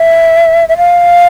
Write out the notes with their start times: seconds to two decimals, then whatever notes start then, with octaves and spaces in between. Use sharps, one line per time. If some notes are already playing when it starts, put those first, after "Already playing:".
Already playing: E5
0.69 E5
0.78 F5